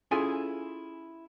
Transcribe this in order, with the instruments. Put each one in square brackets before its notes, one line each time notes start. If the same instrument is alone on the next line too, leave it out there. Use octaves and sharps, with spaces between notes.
[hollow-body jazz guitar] C#4 E4 F4 G#4 A4 G#5